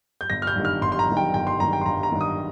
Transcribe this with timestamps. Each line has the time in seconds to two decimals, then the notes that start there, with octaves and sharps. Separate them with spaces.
0.21 G6
0.30 G1 A#6
0.42 F6
0.47 G6
0.56 G2 D#3
0.65 F6
0.81 G1 C6
0.92 C6
0.99 A#5
1.08 G2 D#3
1.17 G5
1.34 G1 G5
1.47 C6
1.60 G2 D#3 A#5
1.73 G5
1.81 C6
1.86 G1 A#5
2.03 A#5
2.12 G2 D#3
2.21 D#6